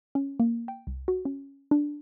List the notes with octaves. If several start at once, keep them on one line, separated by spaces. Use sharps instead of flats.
C#4
A#3
G5
C2
F#4
C#4
D4